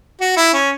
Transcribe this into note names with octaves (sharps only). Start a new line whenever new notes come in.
F#4
E4
C#4